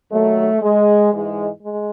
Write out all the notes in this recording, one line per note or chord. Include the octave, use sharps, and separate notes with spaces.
D#2 D#3 F#3 A3
G#3
G#2 E3 G#3
G#3